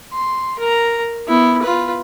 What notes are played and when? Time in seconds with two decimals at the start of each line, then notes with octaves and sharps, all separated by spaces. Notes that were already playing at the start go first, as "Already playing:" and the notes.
0.13 C6
0.59 A#4 A#5
1.28 B3 E4
1.62 F4 B4